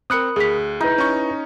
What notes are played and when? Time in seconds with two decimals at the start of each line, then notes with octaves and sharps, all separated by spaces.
0.10 C4 A#4 B5 D#6 F#6 C#7
0.36 D2 G#4 B6
0.81 D#4 E4 B4
0.98 C#4 C#6